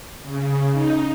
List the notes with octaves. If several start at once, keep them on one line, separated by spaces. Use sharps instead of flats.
C#3
D#4